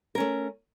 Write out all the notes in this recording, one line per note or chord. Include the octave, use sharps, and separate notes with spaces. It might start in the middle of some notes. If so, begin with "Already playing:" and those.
A3 C#4 A#4